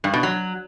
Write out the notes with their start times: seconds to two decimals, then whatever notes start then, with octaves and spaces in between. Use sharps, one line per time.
0.04 G2
0.14 B2
0.23 F#3